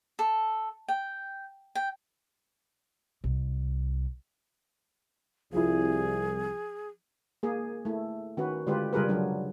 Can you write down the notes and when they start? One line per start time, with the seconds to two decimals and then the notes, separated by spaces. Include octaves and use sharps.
0.19 A4
0.88 G5
1.75 G5
3.24 C2
5.52 C2 F3 E4 G#4
7.43 A#3 G#4
7.85 A3 E4
8.37 D#3 C#4 F#4 B4
8.67 D3 G#3 F4 G4 B4
8.93 C#3 G3 F4 G#4 A#4 B4
9.09 F#3 D4